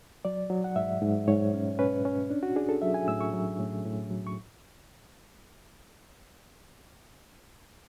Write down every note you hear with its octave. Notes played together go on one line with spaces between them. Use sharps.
F#3 D5
F#3
F#5
G#2 E5
G#2
G#2 C#5
C#4
C#4 B4
C#4
D4
F#4
D4 G#4
A4
F#3 E5
G#5
A2 E6
C#6
F#3
A2
A2
F#3
C#6